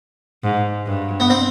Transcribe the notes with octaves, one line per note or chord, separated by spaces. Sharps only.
G#2
G2
B3
C4